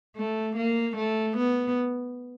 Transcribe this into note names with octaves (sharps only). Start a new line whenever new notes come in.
A3
A#3
A3
B3